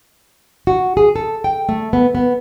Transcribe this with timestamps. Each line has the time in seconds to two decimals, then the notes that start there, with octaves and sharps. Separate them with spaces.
0.67 F#4
0.97 G#4
1.16 A4
1.44 G5
1.69 A3
1.93 B3
2.15 B3